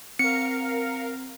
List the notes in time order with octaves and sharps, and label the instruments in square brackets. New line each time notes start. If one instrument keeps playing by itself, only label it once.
[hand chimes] C4 [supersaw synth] A#4 F5 [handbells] C#7